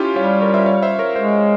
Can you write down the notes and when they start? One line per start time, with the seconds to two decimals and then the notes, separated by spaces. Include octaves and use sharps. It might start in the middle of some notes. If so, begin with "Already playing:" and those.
Already playing: C#4 E4 F4 G4
0.16 G3 C#5 F5
0.41 A#4 C#5
0.54 C5 E5
0.66 C#5 F5
0.83 C5 E5
0.99 A#4 C#5
1.16 G#3 C5 E5